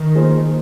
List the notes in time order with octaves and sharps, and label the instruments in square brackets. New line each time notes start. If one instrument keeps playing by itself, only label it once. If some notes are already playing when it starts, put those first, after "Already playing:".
Already playing: [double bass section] D#3
[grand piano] F3 A#3 G#4 C5